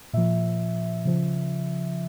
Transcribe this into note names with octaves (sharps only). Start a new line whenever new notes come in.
A#2 F3 E5
C#3 F3